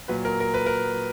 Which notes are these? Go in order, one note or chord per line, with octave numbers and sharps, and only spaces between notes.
A#2 F#3 B4
A#4
A#4
B4
A#4